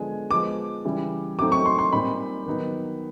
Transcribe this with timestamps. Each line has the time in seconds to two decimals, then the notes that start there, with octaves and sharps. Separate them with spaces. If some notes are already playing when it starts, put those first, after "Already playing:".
Already playing: D3 F3 G#3 B3 G#5
0.31 F3 G#3 B3 D6
0.85 C#3 E3 G3
1.39 F#3 A3 C4 D#4 D6
1.52 C#6
1.66 C6
1.79 C6
1.93 A#2 G3 C4 D#4 B5
2.46 D#3 F#3 B3 D#4